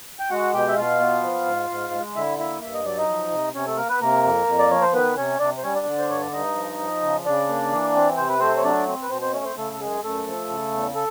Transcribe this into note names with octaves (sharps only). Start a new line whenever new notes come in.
G5
G#3 F#4 F#5
B2 G4 G5
E5
B2 F4 F5
B3
F3
G#2
G#2
G#3
D3 E4 E5
A#3 E4 E5
G2 E5
D#5
F#3 D5
D#4 D#5
F3
C3
C3 C#4 C#5
A3 A4
A#3 A#4
B3 B4
C3 A#3 A#4
F2
F2
D5
F3 C#5
C5
D#3 B3 B4
C3 C#4 C#5
C3 D4 D5
C5
G3 C#4 C#5
D4 D5
D3
C5
G2 C#5
D5
G2 D#4 D#5
F3
F3
C#3
C#3 D4 D5
A#3
E3
C4
C3 C5
B4
A3 C4 C5
C#5
F#3 D4 D5
C4
B4
B2 C4 C5
C4 C5
A3 C#4 C#5
C4 C5
C#3 A3 A4
A4
F#2 G#3 G#4
F#2 A3 A4
F3
C#3
E2
A4